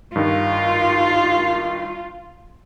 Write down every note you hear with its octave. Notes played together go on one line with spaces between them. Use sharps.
G2 D#3 F4